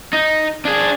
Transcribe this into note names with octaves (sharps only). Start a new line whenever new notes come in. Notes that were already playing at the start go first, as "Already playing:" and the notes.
D#4
D4 G#4